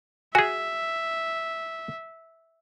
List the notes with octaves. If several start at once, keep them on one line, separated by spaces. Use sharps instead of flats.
F#4 G#4 E5 G#5